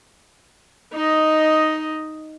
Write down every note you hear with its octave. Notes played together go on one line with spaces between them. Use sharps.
D#4 D#5